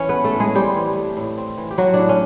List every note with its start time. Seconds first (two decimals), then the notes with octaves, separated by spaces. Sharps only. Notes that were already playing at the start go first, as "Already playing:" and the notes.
Already playing: E3 C#4 C#5
0.09 A3 B3 B4
0.24 A3 A4
0.35 A2
0.40 G#3 G#4
0.55 G3 C4 G4
0.76 E3
0.96 A3
1.17 A2
1.37 C4
1.58 E3
1.71 G4
1.78 F#3 A3 F#4
1.94 D4
1.99 A2
2.09 C#4